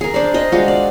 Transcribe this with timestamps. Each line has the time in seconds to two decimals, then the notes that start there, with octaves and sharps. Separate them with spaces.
0.01 G#4 A#4
0.14 D4 C5 D5
0.34 C5 D#5 G5
0.52 G#3 D4 F4 F#4
0.68 D5